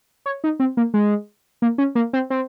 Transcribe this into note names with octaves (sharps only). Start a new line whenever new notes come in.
C#5
D#4
C4
A#3
G#3
A#3
C#4
A#3
C4
C4